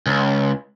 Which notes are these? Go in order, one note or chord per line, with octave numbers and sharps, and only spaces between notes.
C#2